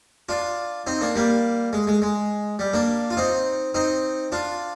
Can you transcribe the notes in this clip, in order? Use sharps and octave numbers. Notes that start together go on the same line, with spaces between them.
D4 F4
C4 D#4
A#3 D4
G3 A#3
G#3
G#3
G#3
G3
A#3 D4
F4
C4 D#4
C4 D#4
D4 F4